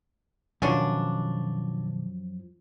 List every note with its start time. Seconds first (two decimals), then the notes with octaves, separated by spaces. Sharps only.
0.62 F#2 B2 D3 D#3 F3 C#4 D4